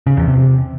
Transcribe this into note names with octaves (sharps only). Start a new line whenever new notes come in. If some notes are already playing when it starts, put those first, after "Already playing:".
C#3
E2
C3